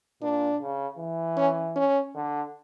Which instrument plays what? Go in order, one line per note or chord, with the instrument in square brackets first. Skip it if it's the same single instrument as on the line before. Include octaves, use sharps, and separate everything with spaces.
[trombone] A#2 [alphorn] D4
[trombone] C#3
E3
[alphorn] C#4
C#4
[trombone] D3